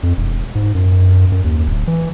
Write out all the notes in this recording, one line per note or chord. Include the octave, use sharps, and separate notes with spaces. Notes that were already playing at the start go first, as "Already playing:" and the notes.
F2
E1
G#2
F#2
F#2
D#2
D1
E3